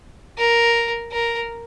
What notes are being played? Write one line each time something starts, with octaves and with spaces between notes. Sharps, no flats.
A#4
A#4